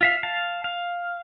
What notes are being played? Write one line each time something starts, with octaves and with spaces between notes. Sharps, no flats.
F4 E5 F5
F5 A5
F5